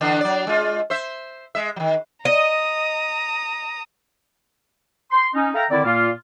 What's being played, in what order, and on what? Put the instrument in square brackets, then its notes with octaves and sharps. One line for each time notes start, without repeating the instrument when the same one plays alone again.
[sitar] D3 E3 D4
F#3 D5
G#3 F4
C5 E5
G#3 E5
D#3 F#3
[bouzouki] D#5 [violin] A#5 D#6
[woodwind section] C6
C#4 D#4
A4 E5 F5 G5 A#5
D3 D#3 C4 E4 D5
A#2 A#3 F4